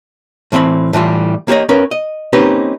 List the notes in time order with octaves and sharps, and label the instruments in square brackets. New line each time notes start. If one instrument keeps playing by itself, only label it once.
[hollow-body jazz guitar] A2 E3 C4 E5 B5
A2 E3 G3 F4
A#3 G4 C#5 D#5
C#4 A#4 B4
D#5
A#3 C4 C#4 D#4 G4 B4